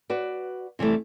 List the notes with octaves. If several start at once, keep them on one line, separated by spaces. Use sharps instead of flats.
F#4 B4 D5
C3 E3 G3 A3